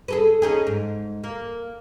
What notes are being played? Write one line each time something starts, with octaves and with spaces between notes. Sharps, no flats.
G#4 A4 B4
C#4 D#4 G#4
G#2
A#3